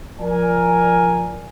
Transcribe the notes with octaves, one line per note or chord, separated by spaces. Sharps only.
F3 A#4 D5 G#5